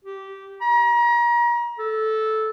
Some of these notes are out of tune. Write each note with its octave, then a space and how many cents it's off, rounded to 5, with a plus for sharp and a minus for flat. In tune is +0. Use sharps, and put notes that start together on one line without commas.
G4 -15
A#5 +35
A4 -10